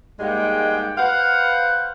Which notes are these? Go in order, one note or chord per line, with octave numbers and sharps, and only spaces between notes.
G#2 G3 G#3 A#3 F#5 G5
B4 C5 F5 F#5